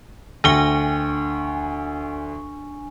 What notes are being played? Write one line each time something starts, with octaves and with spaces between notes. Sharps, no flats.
D2 D4 G#5 C#6 G7